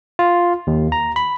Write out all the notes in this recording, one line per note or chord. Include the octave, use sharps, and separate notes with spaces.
F4
D#2
A#5
B5